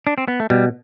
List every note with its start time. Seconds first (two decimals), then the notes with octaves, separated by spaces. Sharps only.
0.07 D4
0.18 C4
0.28 B3
0.40 A3
0.50 B2 G3